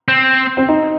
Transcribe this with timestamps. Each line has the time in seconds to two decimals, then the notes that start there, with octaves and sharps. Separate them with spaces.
0.08 C4
0.57 C4
0.69 D#4